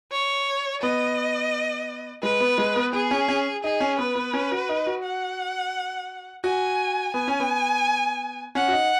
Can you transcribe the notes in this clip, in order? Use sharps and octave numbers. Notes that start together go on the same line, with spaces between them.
C#5
B3 D#5
G#3 B4
B3
G#3
B3
B3 G#4
C#4
C#4
D#4 G#4
C#4
B3 B4
B3
C#4
F#4
D#4
F#4
F#5
F#4 G#5
B3 G#5
C#4
B3
C#4 F#5
F#4
D#4